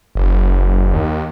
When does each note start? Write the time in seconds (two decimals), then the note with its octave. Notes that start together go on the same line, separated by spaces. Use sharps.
0.15 F#1
0.94 D#2